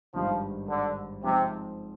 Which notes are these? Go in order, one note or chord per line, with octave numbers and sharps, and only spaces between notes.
G#1 G2 D#3 F3
D3
G#2 C3 F3 C4